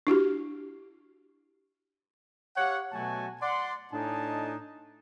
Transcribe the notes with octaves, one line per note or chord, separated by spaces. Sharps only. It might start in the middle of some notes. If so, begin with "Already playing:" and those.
D4 E4 F#4 G4
G4 C#5 F5 F#5
B2 F#3 A3 F#4 G#5 A5
D5 F#5 C6
A2 D4 D#4 D#5 G#5 A5